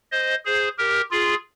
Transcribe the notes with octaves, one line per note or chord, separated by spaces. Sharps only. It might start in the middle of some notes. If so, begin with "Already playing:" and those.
C5 D#5
G#4 C5
G4 A#4
F4 G#4